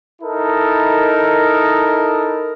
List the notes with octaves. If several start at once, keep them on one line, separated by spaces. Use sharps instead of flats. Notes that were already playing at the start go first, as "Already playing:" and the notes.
D#4 E4 A4 A#4